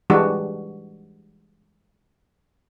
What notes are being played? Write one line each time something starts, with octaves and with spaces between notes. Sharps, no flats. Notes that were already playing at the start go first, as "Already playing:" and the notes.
E3 G3 G#3 D4 F#4